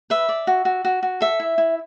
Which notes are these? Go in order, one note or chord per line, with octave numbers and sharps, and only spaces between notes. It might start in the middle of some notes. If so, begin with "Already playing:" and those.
B4 E5
D5
F#4
F#4
F#4
F#4
A4 E5
E4
E4